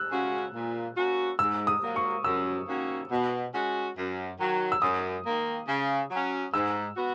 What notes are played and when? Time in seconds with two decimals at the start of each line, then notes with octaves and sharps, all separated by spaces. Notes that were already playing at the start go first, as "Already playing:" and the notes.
Already playing: E6 F#6
0.11 C#3 G#3 C#4 F#4
0.53 A#2
0.96 A#3 C#4 F#4
1.39 G#2 E6
1.67 D#6
1.82 F#3 A#3
1.96 C#6
2.24 F#2 E6
2.68 D#3 A#3 C#4 F#4
3.11 B2
3.53 G#3 C#4 F#4
3.97 F#2
4.39 D#3 F#3
4.72 E6
4.82 F#2 D#6
5.25 D#3 A#3
5.67 C#3
6.10 F#3 C#4
6.53 G#2 E6
6.96 B3 F#4